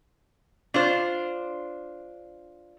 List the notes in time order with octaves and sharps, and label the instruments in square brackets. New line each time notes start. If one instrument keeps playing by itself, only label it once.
[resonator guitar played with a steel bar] D4 F4 C5